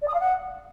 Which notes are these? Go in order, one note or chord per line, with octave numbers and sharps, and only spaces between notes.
D5
D#6
F5
F#5